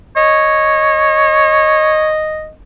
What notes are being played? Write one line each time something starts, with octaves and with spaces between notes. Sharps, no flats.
C#5 D#5